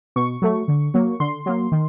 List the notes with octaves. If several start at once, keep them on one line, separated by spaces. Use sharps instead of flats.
B2 C#6
F#3 A3
D3
F#3 A#3
D3 C6
F#3 A#3
D#3